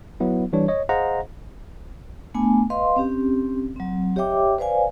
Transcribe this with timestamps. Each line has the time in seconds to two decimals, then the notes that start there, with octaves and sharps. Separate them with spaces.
0.20 F#3 B3 E4
0.53 E3 G3 D4 C#5
0.68 C#5 D#5
0.89 G#4 C5 D#5 F5 F#5 A#5
2.34 A3 B3 D4 G#5
2.70 B4 D#5 F5 C6
2.96 C4 C#4 G4
3.76 F#3 C4
4.16 G4 C#5 D#5 E5 G5 D6
4.59 B4 C5 D5 F5 G#5